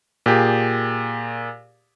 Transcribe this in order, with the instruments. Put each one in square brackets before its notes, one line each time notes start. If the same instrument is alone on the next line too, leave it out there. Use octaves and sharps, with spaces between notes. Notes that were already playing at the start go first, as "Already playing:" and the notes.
[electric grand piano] A#2 G4 G#4